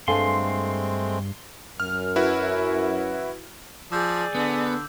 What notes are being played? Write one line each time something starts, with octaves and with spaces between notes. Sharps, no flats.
G2 G#3 A3 C4 A4 F5 G#5 C6
F#2 F6
E4 F#4 B4
F3 G#4 D5 D6 E6 G6
D3 B3